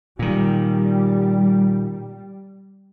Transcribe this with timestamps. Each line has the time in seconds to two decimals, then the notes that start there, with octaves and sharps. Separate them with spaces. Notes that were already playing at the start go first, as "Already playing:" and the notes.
0.19 A#2 D#3 G3